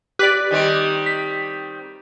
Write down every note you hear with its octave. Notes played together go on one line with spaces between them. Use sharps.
G4 B4 D5 F#6 B6
D#3 G3 C4
B6